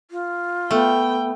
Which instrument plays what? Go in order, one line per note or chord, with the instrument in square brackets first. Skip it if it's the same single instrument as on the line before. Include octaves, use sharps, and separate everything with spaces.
[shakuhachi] F4
[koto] A3 [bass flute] B3 [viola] G5